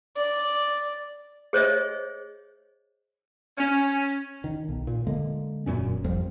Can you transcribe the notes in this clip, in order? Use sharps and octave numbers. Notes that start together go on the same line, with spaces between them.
D5
G#4 C5 C#5 D#5 E5
C#4
D#3
B1
A#2
D3 G#3 A#3
E1 F#2 A#2 C#4
G#1 F2 F3 G3